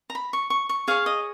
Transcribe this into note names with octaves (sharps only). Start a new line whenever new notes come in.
A#5
B5
C#6
C#6
C#6
G#4 C#5 F5
D#5